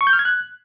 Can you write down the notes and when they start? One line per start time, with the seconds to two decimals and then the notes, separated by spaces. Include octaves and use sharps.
0.01 C#6
0.07 G6
0.13 F6
0.19 G#6
0.25 F#6